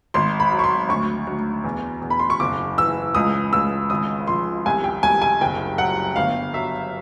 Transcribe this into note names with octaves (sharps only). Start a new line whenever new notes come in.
G#1 C6
B5
F#3
C#6
C6
D2 C#6
D2
E2
E2
B5
C6
C#6
F#1 D6
E3 E6
C#2 D#6
C#2 E6
G#1 D#6
F3 C6
C2 G#5
G5
C2 G#5
G#5
F#1 G5
F#3 F#5
G1 F5
F#3 E5